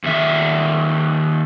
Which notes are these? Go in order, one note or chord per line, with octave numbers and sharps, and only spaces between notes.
D#2 E5